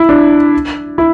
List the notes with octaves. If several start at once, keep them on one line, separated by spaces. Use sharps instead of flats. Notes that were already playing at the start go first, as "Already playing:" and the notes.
Already playing: E4
D4
E4